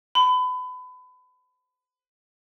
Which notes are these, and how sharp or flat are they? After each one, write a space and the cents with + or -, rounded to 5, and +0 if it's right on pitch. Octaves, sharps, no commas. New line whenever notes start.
B5 +30